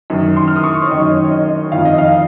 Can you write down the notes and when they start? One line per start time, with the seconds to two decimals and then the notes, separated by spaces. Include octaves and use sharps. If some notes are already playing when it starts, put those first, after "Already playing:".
0.10 F#2 D#3
0.37 C6
0.48 F6
0.56 D#6
0.64 C#6
0.82 C#5
0.91 F#2 D#3 D#5
1.11 C#5
1.25 C#5
1.31 D#5
1.71 F2 D#3 F5
1.85 D#5
1.98 F5